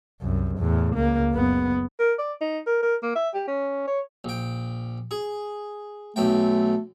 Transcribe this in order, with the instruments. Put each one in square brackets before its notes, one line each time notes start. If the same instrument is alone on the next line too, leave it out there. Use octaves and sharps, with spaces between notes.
[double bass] C2 F#2
E2 A2
C#2 A#3
F#1 B3
[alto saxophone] A#4
D5
D#4
A#4
A#4
A#3
E5
G4
C#4
C#5
[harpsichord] A#1 G5
G#4
[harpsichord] B1 F#2 G5 [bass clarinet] A3